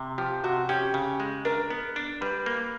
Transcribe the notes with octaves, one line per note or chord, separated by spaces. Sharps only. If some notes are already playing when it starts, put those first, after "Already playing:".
Already playing: C3
F3 G4
C3 F#4
C#4 G4
C#3
G#3
D4 A#4
B3
D4
G3 B4
A#3